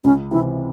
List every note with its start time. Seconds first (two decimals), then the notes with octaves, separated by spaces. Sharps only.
0.04 C#2 C#4
0.31 C3 E3 C4 E4